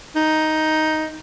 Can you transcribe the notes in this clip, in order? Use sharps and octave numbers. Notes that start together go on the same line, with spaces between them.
D#4